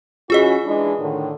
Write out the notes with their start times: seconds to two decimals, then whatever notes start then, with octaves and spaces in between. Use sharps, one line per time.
0.30 E3 C#4 F4 F#4 G#4 D#5
0.64 E3 G#3 D4
0.99 A2 D3 D#3